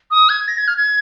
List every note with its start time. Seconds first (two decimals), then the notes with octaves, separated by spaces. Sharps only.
0.11 D#6
0.29 G#6
0.48 A#6
0.58 G#6
0.68 F6
0.77 G#6